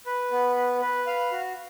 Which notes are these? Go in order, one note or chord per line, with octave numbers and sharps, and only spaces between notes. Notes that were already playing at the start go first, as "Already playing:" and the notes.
B4
B3
B4
B4
F5
F#4